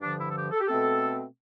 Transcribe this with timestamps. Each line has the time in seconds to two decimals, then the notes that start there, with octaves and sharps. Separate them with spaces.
0.01 G2 D3 F3 D4
0.18 E4
0.29 A4
0.35 G4
0.52 A4
0.61 G4
0.68 B2 A3 C4 A4